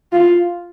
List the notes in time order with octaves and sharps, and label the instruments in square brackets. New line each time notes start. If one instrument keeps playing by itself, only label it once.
[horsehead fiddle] F4